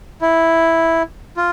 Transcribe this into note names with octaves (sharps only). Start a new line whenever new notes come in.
E4
F4